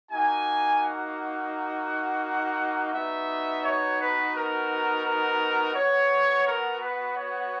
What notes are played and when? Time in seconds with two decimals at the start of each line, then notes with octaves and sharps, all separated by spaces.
0.10 A#3 D#4 F#4 G#5
0.81 F#5
2.93 B3 D#4 F#4 E5
3.63 C#5
3.99 B4
4.34 A#4
5.04 A#4
5.75 B3 F#4 C#5
6.45 A#4
6.80 B4
7.16 C#5